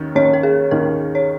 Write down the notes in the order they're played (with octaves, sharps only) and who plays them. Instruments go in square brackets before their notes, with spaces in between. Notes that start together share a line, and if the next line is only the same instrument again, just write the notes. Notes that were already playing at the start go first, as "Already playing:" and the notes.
Already playing: [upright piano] D#2 D#3 C#4
[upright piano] D#2 D#3 A#3 C#4 [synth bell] C#5
[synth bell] A#4
G#4
[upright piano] D#2 D#3 A#3 C#4 [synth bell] A#4
[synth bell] C#5